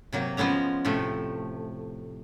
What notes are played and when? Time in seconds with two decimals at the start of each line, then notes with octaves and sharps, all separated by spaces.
0.13 C3 F#3 A#3
0.37 F3 G#3 B3 C#4 A#5
0.85 A2 C3 F3 A3